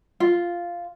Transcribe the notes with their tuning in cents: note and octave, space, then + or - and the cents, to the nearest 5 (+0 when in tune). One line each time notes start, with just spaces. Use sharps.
F4 -5